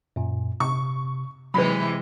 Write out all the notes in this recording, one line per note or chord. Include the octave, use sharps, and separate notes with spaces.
F#2 A#2
C3 C#6
C3 E3 F#3 G#3 B4 B5